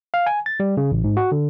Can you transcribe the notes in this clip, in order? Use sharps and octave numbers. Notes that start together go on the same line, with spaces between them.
F5
G#5
A6
G3
C#3
A1
G#2
F#4
D3